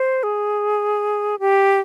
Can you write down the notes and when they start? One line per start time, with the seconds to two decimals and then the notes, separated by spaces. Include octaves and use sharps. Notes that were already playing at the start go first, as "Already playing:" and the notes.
Already playing: C5
0.23 G#4
1.39 G4